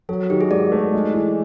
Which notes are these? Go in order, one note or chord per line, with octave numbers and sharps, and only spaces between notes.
F#3 A4
D#3 G4
G#4
G#2 D5
A3
G#3
E3